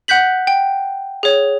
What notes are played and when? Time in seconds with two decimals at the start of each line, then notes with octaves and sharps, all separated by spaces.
0.08 F#5 F#6 G6 B6 F#7
0.47 G5
1.23 G#4 C#5